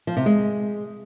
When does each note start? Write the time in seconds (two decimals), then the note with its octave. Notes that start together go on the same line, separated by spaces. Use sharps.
0.07 F3
0.17 C3
0.26 G#3